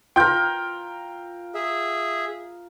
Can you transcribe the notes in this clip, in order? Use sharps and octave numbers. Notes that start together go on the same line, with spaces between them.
F4 A#4 G5 G6
G#4 E5